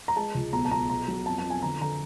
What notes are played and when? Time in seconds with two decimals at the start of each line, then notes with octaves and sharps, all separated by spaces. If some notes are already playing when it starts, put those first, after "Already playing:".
0.08 A#5
0.16 G#3 A5
0.35 C#2
0.53 B1 A#5
0.65 A5
0.71 B1 A#5
0.89 B2 A#5
1.08 F#3
1.26 F2 A5
1.38 A5
1.44 F2
1.50 G#5
1.62 D3 A#5
1.80 D3 A#5